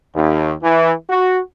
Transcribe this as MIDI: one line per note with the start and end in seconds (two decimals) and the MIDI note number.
0.15 0.54 39
0.63 0.92 52
1.10 1.39 66